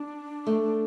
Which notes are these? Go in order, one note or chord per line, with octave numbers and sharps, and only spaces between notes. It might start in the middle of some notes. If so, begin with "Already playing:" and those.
Already playing: D4
A3